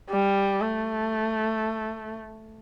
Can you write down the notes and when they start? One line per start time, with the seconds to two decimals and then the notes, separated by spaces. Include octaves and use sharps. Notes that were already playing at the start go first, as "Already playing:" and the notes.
0.10 G3
0.61 A3